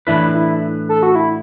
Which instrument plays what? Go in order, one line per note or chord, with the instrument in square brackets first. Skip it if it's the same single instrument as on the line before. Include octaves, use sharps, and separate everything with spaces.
[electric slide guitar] A2 E3 D4 B4 [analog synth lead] E4
[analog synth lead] E4
A4
F#4
E4